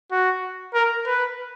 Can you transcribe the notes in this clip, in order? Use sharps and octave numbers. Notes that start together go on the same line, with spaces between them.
F#4
A#4
B4